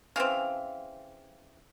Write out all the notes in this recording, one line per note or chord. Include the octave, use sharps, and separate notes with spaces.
C#3 E3 C4 F5